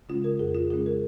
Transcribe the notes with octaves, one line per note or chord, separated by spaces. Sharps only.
C#3 G#3 C#4 F4
A#4
F2 G#4
F4
C#3 G#3 C#4 G#4
A#4